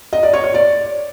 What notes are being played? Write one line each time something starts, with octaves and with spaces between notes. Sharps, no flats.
D#5
D5
C#5
C#5
D5